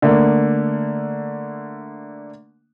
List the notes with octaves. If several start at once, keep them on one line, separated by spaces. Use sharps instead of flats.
D3 A3 A#3